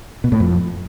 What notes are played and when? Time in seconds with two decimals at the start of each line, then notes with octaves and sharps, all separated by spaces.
0.24 B2
0.32 A2
0.40 F2